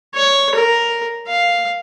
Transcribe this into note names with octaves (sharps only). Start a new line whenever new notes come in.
C#5
A#4
F5